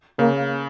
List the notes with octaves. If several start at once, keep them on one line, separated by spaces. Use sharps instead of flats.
C#3 A#3